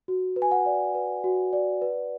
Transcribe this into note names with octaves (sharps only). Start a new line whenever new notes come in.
F#4
B4
G#5
F#5
D5
B4
F#4
D5
B4